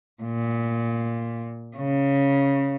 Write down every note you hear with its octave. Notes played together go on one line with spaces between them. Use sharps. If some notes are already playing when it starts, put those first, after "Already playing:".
A#2
C#3